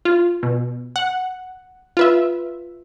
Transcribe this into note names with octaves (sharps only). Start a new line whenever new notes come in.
F4
B2
F#5
F4 B4 E5